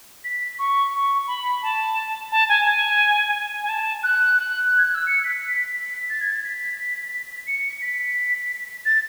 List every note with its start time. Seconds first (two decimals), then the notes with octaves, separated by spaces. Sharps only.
0.24 B6
0.59 C#6
0.94 C#6
1.27 B5
1.63 A5
2.32 A5
2.49 G#5
2.65 G#5
3.63 G#5
3.69 A5
4.03 F#6
4.38 F#6
4.78 G#6
4.84 F#6
4.94 E6
5.07 C#7
5.24 B6
5.75 B6
6.09 A6
6.21 G#6
6.32 A6
6.44 B6
7.47 C#7
7.81 B6
8.85 A6